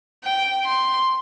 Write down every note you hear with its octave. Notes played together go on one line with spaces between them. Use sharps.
G5
C6